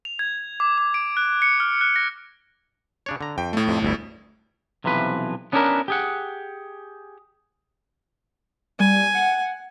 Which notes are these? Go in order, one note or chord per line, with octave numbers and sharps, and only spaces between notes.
F7
G#6
D6
D6
D7
F#6
C#7
F6
F#6
A#6
C#3 D4 C#5
D3 A#5
F2 G5
A2 A3
F2 C3
G1 D2 E4
B1 C3 E3 F3 B4
B3 C#4 D4 E4 G#4 A#4
G4 G#4 F#5
G3 G#5
F#5